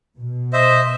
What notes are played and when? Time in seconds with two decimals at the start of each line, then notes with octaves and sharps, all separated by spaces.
0.17 B2
0.53 C5 D#5 E5